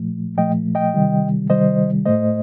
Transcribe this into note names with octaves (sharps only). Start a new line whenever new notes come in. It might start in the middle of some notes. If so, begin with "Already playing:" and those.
Already playing: A#2 F3 A3
A#2 F3 A3 D#5 G5
D#5 G5
C3 D#3 G3
C3 D#3 G3 C5 D#5
A2 A3 C5 D#5